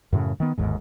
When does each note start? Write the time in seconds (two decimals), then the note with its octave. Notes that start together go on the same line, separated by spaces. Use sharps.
0.13 F#2 A2 C#3
0.40 D#3 B3
0.58 G1 D#2 G#2